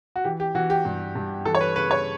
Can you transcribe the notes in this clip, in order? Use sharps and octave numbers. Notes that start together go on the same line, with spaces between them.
F#4
E3 G4
G4
E3 F#4
G4
G2
G2
E3 A4
C#5
B4
C#3 B4
C#5